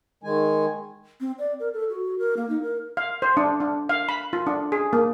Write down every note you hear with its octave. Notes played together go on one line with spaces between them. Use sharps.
D#3 G#3 G#5
C4
D5
A#4
A4
F#4
A#4
A#3
D#4
A#4
F5
C5
D4
D4
F5
B5
F4
D4
G#4
A#3